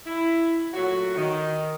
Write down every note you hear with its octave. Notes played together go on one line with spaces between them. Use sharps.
E4
A#2 F#3 A3 F#4
D#3